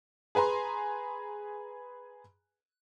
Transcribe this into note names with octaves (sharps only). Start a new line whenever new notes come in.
G#4 B4 G#5 A#5 C6